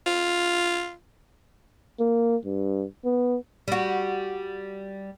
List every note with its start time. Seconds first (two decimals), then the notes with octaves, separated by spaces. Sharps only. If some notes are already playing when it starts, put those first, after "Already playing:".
0.06 F4
2.00 A#3
2.45 G2
3.05 B3
3.68 G3 F#4